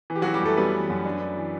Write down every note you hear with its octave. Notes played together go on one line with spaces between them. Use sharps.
E3
G4
E3 F#3 F#4
G3 G4
F#2 A3 A4
G3 B3 B4
E3
F#2
D4
D4
E3